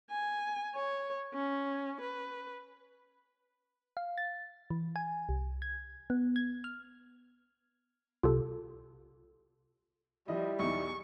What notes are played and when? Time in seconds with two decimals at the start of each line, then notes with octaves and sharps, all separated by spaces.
0.11 G#5
0.75 C#5
1.34 C#4
2.01 B4
3.97 F5
4.18 A6
4.70 E3
4.96 G#5
5.29 C2
5.62 G#6
6.10 B3
6.36 G#6
6.64 F6
8.23 C2 F4 G4 A4
10.28 F3 G3 E4 D#5
10.59 B1 E2 D#4 C#6